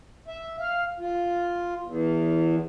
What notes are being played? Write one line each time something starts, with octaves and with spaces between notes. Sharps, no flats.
E5
F5
F4
E2